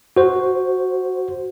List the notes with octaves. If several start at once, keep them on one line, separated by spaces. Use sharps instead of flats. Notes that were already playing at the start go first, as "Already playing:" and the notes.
F#4 C5